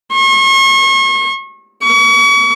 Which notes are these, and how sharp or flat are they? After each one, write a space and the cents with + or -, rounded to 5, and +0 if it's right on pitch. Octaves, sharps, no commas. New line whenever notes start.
C#6 -40
C#6 +40